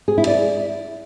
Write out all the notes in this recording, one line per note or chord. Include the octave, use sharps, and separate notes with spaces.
G#4
E4
D5